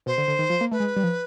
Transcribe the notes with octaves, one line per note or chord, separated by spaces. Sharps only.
B2 C5
D3
D3
D#3
F3
A#3
A3 B4
G#3
G3
F3